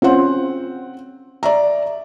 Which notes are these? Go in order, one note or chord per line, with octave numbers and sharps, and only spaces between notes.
C4 C#4 F4 C5 F#5
D5 E5 A#5